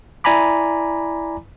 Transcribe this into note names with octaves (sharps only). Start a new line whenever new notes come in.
E4 D5 G#5 A#5 B5 D6